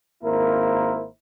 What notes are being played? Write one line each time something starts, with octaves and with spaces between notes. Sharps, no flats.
G#1 A#3 E4 A#4 C5